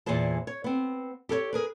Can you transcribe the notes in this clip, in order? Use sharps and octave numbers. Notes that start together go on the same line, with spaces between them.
E2 A#2 E3 G#4 C5 A5
C#5
B3 C4
G4 A4 B4 C#5
G#4 A#4 B4